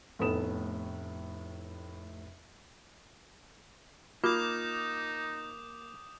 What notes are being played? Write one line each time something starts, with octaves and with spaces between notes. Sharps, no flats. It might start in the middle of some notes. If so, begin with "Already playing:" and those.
F1 A2 A3 B3 D#6 E7
A#3 D#4 F4 D6 D#6 G6